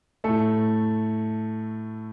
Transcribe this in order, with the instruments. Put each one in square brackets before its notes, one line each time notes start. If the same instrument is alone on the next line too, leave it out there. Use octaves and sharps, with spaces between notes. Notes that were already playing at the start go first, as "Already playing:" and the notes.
[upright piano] A2 A3 A4